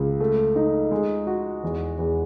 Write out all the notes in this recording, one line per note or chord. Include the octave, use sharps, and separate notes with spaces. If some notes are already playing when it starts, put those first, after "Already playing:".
Already playing: C#2
A3
D#4
G#3
F#4
E2
E2